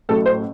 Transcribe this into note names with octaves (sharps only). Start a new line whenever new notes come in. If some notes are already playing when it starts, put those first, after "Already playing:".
A1 A2 F#3 A3 A4
C5